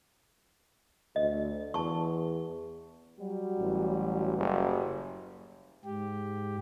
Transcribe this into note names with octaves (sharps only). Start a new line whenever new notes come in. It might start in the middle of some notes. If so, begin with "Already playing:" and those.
D2 D#5
E2 A5 C#6
F#3 G3 F#4
A1
F#1
G#2 G4